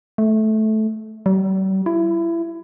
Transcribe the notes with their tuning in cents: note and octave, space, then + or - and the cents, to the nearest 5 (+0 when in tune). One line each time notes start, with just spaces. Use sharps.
A3 -15
G3 -45
E4 +25